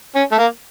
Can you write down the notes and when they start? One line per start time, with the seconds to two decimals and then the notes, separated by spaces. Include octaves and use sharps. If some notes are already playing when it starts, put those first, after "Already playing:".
0.15 C#4
0.32 A3
0.38 A#3